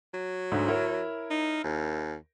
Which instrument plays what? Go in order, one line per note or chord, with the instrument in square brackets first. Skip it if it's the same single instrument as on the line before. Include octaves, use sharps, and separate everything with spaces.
[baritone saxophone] F#3
[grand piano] D2 G#2 D3
E4 A#4 C#5
[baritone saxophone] D#4
D#2